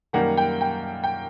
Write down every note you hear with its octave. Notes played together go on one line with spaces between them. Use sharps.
F#2 D#3 G3 A#3 F#5
G5
G5
G5